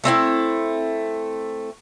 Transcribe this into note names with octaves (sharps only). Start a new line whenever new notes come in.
A3 C4 D#4 E4